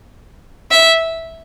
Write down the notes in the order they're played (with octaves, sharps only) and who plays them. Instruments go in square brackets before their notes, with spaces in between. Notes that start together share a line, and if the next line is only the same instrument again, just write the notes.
[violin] E5